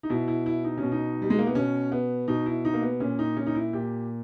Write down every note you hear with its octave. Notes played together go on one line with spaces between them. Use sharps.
D#4
B2 E4
E4
E4
D#4
C#4
B2
D#4
G3
G#3
A#3
B3
B2 C#4
B3
B2 D#4
E4
D#4
A#3
B3
A#2 C#4
D#4
C#4
D#4
E4
A#2 G4